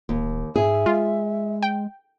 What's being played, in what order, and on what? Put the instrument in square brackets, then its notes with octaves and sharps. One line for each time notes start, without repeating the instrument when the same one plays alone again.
[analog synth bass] D1 [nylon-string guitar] D#2
[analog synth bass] G#2 [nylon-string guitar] G#4 [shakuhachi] E5
[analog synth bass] G#3 [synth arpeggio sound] F4
[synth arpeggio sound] G5